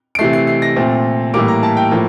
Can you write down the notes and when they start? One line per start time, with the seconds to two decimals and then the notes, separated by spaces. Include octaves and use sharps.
0.15 D7
0.19 C3 E3 A3 C7
0.33 C7
0.47 C7
0.62 A#6
0.76 A#2 A3 C4
1.34 A2 E3 G3 A#3 D6
1.48 A#5
1.63 A5
1.77 G5
1.91 A2 F3 A#3